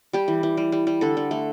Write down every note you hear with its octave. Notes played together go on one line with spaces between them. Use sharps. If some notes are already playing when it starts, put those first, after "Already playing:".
G3 G4
E3
E3
G3
G3
G3
D3 A4
D3
A3